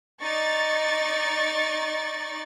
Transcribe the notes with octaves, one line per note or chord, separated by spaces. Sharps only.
D#4 D5 C#6 A6